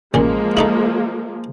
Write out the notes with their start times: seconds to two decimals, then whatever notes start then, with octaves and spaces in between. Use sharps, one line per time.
0.14 A1 A#2 F3 G#3 A#3
0.57 A3 D#4 E4